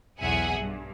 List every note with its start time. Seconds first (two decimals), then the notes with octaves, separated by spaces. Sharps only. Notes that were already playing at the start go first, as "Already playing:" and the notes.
0.21 B1 E2 G#4 E5 F#5 G#5
0.59 G2